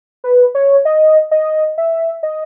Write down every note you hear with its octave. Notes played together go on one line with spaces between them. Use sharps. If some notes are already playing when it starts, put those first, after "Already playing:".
B4
C#5
D#5
D#5
E5
D#5